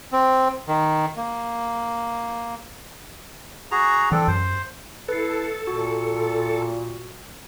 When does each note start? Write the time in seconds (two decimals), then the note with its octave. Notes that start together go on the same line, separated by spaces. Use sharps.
0.12 C4
0.68 D#3
1.17 A#3
3.71 F#4 G#4 A#5
4.12 E3 C4 D4 A4
4.28 F#2 C5
5.09 E4 A4 B4 C7
5.67 A#2 F#4